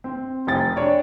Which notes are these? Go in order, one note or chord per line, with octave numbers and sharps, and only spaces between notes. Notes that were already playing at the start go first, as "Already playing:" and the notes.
C4
F1 G5 A6
D4 C#5 D5